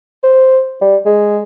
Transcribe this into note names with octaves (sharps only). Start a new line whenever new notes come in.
C5
G3
G#3